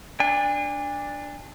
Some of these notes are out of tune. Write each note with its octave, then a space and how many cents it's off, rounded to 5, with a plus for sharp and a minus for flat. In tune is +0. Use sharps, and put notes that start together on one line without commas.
D4 +0 G#5 -40